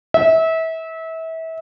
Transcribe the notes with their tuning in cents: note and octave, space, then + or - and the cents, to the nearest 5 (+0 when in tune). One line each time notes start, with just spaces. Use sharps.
E5 -30